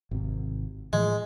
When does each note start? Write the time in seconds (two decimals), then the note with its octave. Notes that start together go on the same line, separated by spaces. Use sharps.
0.11 G#1 C3
0.93 A2 E3 F3 G#3